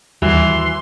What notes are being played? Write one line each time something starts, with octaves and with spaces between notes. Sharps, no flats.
D#2 E3 G3 F#4 C6